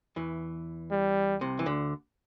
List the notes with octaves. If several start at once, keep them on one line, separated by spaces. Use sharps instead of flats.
E2 E3
G3
C2 C3
E3
D2 D3